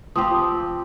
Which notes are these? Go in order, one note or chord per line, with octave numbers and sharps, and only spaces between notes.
F3 C4 G4 D#6